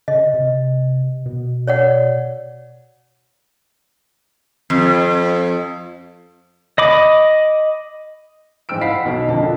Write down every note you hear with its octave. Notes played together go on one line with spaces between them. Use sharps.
C#3 D#5
C3
B2
C#5 D5 F#5
F2
D#5 B5 D6
G#2 E3 C5 G5 E6 D7
F5 F#5 B5 B6 C7
B1 B2
F2 A#2 D3 D#5 A5
D4 F4